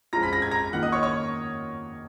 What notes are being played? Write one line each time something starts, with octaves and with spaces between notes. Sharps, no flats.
F2 F3 G#3 C#4 F4 A#5 A#6
B5 B6
A#6
G#6
A#5 A#6
D#3 A#3 F4 F#5 F#6
D#5 D#6
C#5 C#6
C#5 C#6